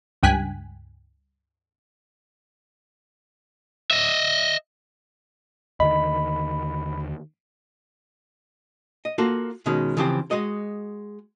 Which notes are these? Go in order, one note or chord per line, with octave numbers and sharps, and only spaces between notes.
C#2 G2 G5 G#5 F#6 B6
D#5 E5
D#2 D3 D#3 D#5 B5
D#5
A#3 F4 F#4 A4
B2 D#3 G#3 C#4
C#3 E3 F3 C4 G4 C5
G#3 F#4 D#5